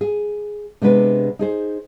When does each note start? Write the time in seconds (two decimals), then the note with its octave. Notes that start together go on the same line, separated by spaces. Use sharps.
0.01 G#4
0.81 C3 G#3 B3 D4 B4
1.39 D#4 G#4 C5